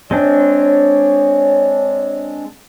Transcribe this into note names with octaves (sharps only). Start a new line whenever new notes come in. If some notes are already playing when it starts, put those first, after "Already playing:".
G#3 C4 D4 C#5